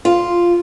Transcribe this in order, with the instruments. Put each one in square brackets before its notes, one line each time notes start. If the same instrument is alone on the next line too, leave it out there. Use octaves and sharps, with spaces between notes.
[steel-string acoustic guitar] F4